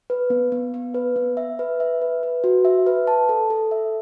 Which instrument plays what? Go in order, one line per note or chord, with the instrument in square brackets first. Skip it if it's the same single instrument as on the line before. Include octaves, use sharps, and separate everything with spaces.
[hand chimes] B4
B3
B3
B3
B4
B3
E5
B4
E5
B4
B4
F#4
E5
B4
A5
A4
A4
E5